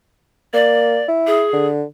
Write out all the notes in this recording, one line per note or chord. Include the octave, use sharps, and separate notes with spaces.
A#3 D5
E4
G#4
D3